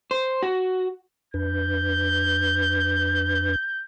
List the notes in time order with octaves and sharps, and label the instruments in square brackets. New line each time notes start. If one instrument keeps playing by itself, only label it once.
[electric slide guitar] C5
F#4
[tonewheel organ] F2 D4 B4 [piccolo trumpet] G6